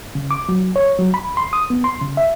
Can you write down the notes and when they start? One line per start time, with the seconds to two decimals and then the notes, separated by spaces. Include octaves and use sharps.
0.15 C#3
0.31 D6
0.49 F#3
0.76 C#5
0.99 F#3
1.14 B5
1.37 C6
1.53 D#6
1.70 B3
1.84 C6
2.01 C#3
2.17 E5